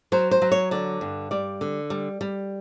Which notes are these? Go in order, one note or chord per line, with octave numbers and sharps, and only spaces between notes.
F#3 C5
C5
F#3
C#5
D3 D5
G2
G3 D5
D3
G3
G3